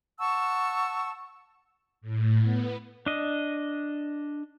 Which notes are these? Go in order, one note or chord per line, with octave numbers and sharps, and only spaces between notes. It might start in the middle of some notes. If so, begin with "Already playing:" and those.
F#5 A5 C#6 E6
A2
B3
D4 D#5